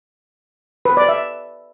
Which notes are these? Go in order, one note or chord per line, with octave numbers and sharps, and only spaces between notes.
B4
D5
E5